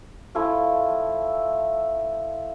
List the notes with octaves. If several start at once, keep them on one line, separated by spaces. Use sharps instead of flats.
F3 A3 E4